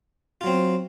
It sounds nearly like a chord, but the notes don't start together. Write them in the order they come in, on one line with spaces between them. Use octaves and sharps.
F4 F#3 C4